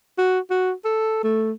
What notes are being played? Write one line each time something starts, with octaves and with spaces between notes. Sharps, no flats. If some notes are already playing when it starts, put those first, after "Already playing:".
F#4
F#4
A4
A3